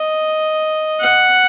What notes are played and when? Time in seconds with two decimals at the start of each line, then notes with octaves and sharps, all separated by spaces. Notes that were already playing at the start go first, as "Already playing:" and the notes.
Already playing: D#5
1.01 F#5